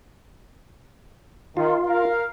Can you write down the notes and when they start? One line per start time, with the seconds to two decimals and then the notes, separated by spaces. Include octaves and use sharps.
1.57 D#3 F4
1.87 A#4 F5